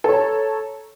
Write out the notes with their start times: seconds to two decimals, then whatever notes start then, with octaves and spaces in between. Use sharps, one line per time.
0.04 A4
0.08 C#5
0.13 A#5